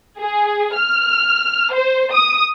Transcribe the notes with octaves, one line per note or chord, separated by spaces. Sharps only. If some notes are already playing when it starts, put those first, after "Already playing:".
G#4
F6
C5
D#6